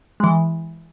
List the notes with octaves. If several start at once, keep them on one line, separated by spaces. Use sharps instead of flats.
E3 G#3